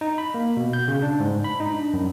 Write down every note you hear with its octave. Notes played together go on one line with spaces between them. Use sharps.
D#4
B5
A#3
B2
G6
C#3
D4
G#2
B5
D#4
D4
F#2